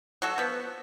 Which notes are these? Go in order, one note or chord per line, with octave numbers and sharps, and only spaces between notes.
F#3 F#4 A4
F3 B3